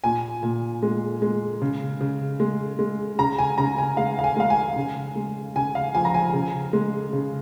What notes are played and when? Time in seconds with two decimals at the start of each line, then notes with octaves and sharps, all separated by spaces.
0.04 A#2 G#5
0.43 A#2
0.83 G#3
1.22 G#3
1.62 C#3
2.01 C#3
2.40 G#3
2.79 G#3
3.19 C#3 A#5
3.38 G#5
3.58 C#3 A#5
3.78 G#5
3.97 G#3 F5
4.19 F5
4.24 G#5
4.36 G#3 F5
4.50 G#5
4.76 C#3
5.16 G#3
5.56 C#3 G#5
5.75 F5
5.95 F3 G#5
6.05 A#5
6.14 G#5
6.33 C#3
6.73 G#3
7.13 C#3